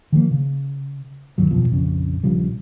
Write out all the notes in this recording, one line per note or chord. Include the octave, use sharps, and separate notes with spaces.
D#3 F3 G3 A#3
C#3
G1 D#2 D#3 F#3
D#1 F2 B2 F3
A#1 F2 C#3
A#1 C#3 F3 G3